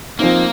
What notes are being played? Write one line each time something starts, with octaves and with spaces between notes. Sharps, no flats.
F3 A#3 C4 D#4